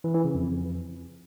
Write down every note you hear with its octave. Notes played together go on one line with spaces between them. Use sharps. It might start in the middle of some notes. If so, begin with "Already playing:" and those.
E3
E3
C#3
F2